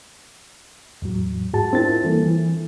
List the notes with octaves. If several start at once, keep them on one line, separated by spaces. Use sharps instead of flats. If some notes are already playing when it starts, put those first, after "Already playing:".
E2 A2 F#3
G#2 F#4 G#4 A5
C4 D4 E4 F4 A#4 A6
E3 G3 A#3 A4
E3